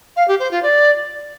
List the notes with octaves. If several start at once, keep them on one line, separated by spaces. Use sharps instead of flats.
F5
G4
C5
F4
D5